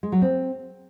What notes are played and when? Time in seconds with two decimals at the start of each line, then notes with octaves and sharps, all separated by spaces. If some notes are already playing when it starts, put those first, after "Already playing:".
0.03 G#3
0.12 F#3
0.22 C4